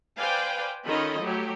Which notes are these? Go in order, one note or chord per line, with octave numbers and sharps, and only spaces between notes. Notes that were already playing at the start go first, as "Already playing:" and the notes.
B4 C5 D5 F5 G5 G#5
D#3 C#4 F4 A4 D#5 B5
F#3 A3 G4